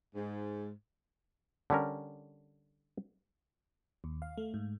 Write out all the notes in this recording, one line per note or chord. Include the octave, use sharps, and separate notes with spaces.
G#2
D3 G3 C#4 A#4
D#2
F5
A3
G#2